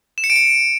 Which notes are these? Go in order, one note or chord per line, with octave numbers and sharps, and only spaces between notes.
E7
C#7
D7
C#7